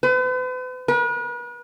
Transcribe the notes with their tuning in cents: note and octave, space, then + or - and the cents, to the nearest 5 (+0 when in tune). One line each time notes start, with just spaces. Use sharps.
B4 +45
B4 -40